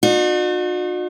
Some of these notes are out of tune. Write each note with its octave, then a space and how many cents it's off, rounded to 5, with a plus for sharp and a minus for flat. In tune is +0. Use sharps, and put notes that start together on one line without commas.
D#4 -45 F#4 -45